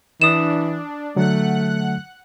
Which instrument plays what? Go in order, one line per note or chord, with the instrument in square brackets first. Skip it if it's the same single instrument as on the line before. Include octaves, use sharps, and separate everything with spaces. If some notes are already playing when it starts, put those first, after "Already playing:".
[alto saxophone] E3 [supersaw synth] D4 [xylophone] D#6 E7
[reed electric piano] D3 F#3 [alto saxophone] A3 [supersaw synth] F#5 F#6